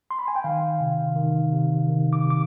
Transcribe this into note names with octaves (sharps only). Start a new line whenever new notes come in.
C6
B5
G#5
G5
D#3 F5
C3
D#3
C3
D#3
D6
C3
D6